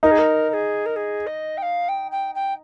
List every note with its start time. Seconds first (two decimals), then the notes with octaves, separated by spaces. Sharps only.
0.03 D#4 A#4
0.11 G#4
0.18 A#4
0.49 A#4
0.53 G#4
0.86 A#4
0.96 G#4
1.27 D#5
1.57 G5
1.62 F5
1.89 G5
2.11 G5
2.35 G5